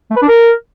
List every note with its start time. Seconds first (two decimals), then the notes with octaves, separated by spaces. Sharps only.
0.11 A3
0.16 B4
0.22 D4
0.28 A#4